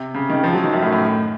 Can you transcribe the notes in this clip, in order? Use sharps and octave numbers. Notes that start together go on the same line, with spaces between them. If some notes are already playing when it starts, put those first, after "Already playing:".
Already playing: C3
C#3
D#3
F3
F#3
D#3
F#2
A2
A2